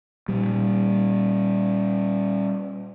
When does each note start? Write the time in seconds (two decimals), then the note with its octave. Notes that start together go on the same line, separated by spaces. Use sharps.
0.28 A#2 G3